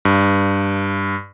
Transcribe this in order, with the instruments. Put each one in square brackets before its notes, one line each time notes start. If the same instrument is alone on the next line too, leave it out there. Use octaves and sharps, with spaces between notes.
[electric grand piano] G2